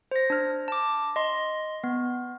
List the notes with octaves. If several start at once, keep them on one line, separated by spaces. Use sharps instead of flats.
C5 A#6
D4 F6
A5 D6
D#5 C6
B3